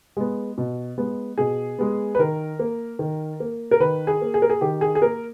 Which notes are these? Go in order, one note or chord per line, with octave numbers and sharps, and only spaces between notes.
G#3 B3
B2
G#3 B3
B2 G#4
G#3 B3
B4
D#3 A#4
A#3
D#3
A#3
A#4
D#3 B4
G#4
A#3
G#4
A#4
G#4
D#3 G4
G#4
G#4
A#3 A#4